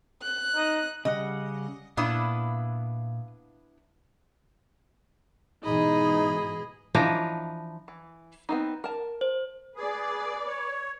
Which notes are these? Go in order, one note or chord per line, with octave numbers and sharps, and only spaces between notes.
F#6
D#4
C#3 G3 D#5 F#5
A#2 B3 D4 E4 F5 D#6
G#2 B2 E3 D#4 G#4 D#5 B5
E3 F3 D4 D#4
E3
B3 C4 D#4
A#4 A5
C5
G#4 B4 D5
C#5